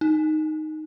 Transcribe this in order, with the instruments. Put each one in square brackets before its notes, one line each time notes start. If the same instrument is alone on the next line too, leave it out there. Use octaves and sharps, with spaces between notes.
[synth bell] D#4